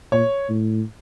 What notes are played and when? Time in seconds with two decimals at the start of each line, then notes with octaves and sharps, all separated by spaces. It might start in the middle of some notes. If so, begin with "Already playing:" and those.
0.12 A#2 C#5
0.49 A2